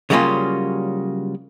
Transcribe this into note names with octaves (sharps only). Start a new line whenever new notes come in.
C#3 F#3 G3 A#3 C#4 F4